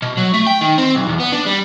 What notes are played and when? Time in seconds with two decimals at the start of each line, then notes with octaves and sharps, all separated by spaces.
0.02 B2
0.17 F#3
0.34 A3
0.47 G5
0.61 D#3
0.78 C4
0.95 B1
1.09 E2
1.20 B3
1.32 D4
1.46 G3